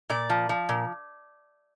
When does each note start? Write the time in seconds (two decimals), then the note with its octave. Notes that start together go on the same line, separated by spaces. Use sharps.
0.10 A#2 D5
0.30 F3
0.49 F3
0.69 A#2